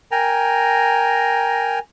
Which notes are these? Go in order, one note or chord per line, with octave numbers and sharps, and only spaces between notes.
A#4 G5 G#5 A#5